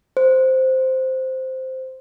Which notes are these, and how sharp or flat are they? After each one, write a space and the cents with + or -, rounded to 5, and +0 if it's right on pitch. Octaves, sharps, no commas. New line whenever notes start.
C5 -5